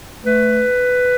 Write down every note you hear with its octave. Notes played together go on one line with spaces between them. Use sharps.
A3 B4